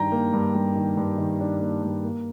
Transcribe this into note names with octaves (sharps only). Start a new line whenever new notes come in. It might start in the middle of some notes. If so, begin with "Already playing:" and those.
Already playing: G2 D#3 D4 G5 A#5
A#3
G2
G2
D#3
G2
D#3
D4
A#3
G2
A#3